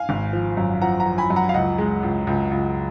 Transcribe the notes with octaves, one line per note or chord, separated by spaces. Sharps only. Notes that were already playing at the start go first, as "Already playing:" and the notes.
Already playing: F5 G#5
G#1
F3
F#2
F3 F#5 A#5
F#5 A#5
F3
G#5 B5
F#2
F#5 A#5
F5
C#2 D#5 F#5
G#3
C#2
C#2
C#2